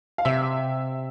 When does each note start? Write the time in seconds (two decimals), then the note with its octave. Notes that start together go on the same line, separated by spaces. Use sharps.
0.18 F5
0.25 C3 E5